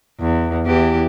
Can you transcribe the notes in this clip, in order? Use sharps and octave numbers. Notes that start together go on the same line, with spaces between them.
E2
E2 E3 G4